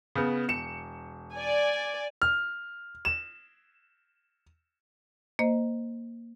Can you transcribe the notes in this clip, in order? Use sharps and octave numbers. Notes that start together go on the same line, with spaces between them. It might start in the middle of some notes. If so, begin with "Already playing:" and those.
C#3 B3
E1 C#7 E7
D5 G#5
F6
E7
A#3 C5 D#5